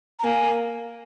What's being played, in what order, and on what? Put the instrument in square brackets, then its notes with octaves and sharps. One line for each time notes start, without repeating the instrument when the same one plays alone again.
[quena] A#5
[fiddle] A#3 [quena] G#5